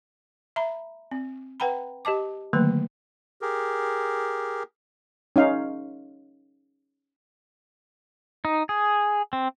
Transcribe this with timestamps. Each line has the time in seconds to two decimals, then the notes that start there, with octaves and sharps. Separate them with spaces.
0.56 E5 A#5 B5
1.11 C4
1.60 B4 F#5 G5 A#5 B5
2.05 G4 D#5 A5 D6
2.53 D3 D#3 F#3 A3 A#3 B4
3.42 G4 G#4 A#4
5.36 C#4 D#4 F5
8.45 D#4
8.69 G#4
9.33 C4